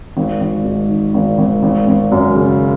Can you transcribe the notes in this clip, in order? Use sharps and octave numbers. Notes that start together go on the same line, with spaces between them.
G#1
G#1
G#2
D#3
G#1
G#1
G#1
G#1
F#2
C#3